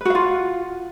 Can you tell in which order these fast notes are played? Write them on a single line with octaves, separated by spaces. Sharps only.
B4 F#4 F5 F4